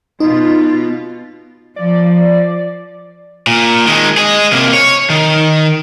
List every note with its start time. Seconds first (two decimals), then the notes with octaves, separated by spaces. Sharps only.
0.20 B2 D#4 F4
1.76 F3 D5
3.47 A#2
3.86 D#3 G#3
4.17 G#4 D#5
4.52 C3 A#3
4.73 C#5
5.10 D#3